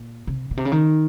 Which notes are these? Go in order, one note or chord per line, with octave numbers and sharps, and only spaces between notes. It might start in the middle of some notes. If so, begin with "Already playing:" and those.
Already playing: A#2
C3
A#2
C3
C#3
D#3